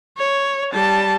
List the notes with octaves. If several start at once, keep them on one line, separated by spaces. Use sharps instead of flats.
C#5
G3 A5